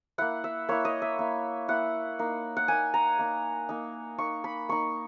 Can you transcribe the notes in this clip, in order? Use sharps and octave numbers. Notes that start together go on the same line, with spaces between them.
A#3 E4 F#5
E5
A#3 E4 C#5
D#5
E5
A#3 E4
A#3 E4 F#5
A#3 D#4
F#5
A#3 D#4 G#5
A#5
A#3 D#4
A#3 D#4
A#3 D#4 C#6
B5
A#3 D#4 C#6